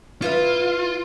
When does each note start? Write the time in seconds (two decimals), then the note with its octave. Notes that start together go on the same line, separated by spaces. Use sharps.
0.22 E4 F4 B4 F5